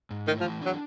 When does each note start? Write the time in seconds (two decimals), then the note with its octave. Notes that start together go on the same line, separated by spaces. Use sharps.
0.10 G#2
0.27 D#3 A3
0.40 F3
0.45 E3
0.62 F#3 D4